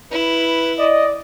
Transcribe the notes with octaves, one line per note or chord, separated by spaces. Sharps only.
E4 B4
D5 D#5